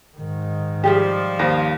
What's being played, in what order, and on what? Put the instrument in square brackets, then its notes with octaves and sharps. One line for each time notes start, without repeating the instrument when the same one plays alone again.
[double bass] G#2 D#3
[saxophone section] F3 G3 [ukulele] G4 G#4 E5
[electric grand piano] D#2 A#6 [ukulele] C5